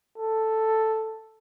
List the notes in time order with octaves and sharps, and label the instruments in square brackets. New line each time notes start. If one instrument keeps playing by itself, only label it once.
[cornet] A4